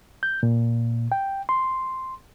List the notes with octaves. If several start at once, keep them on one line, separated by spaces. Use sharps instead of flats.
G6
A#2
G5
C6